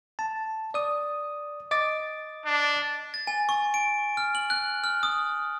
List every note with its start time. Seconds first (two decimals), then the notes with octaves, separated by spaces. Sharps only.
0.19 A5
0.74 D5 D#6
1.71 D#5 D6 A6
2.45 D4
3.14 A6
3.27 G#5
3.49 C#6
3.74 D7
4.17 F6
4.35 F#7
4.50 F#6
4.84 F6
5.03 D#6